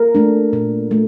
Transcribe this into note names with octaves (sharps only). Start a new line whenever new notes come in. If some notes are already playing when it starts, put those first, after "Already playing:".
Already playing: A#3 A#4
A3 D4
A#2
A3